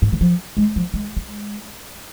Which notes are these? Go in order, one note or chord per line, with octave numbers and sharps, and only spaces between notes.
G#2
D#3
F3
G#3
F3
G#3
G#3